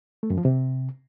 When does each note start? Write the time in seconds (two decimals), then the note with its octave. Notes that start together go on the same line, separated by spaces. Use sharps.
0.23 A3
0.30 F#2
0.38 F3
0.45 C3